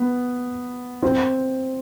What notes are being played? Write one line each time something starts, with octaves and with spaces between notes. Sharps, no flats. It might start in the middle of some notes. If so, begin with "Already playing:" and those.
Already playing: B3
C4